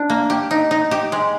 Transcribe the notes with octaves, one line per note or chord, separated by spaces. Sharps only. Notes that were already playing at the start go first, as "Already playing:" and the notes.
Already playing: D4
A#3
G4
D#4
D#4
G4
G#3